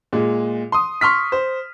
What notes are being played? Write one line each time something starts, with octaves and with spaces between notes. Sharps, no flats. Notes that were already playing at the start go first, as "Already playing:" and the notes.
A#2 G#3
C6 D#6
C6 C#6 F6 B6
C5